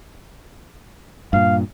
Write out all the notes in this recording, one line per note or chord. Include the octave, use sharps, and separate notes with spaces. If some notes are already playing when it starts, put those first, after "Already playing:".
G2 A#2 F5